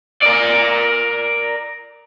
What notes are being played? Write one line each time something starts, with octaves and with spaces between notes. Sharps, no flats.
A#4 D5